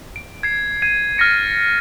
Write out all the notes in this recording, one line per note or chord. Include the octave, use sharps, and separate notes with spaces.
D7
G#6 C7
G#6 C7 D#7
F6 A6 A#6 C#7